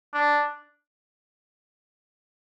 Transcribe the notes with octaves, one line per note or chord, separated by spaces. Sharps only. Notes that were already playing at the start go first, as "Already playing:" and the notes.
D4